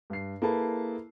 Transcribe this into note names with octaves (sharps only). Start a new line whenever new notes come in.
G2 C7
A#3 E4 G#4 A4 B4 A5